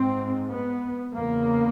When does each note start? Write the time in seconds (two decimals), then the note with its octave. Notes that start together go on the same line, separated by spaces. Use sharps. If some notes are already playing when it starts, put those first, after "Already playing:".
Already playing: G#2 C4
0.50 B3
1.14 E2 C#3 A#3